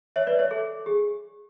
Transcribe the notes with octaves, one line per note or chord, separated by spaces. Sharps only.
C#5 E5
B4 D5
C#5 E5
A4
G#4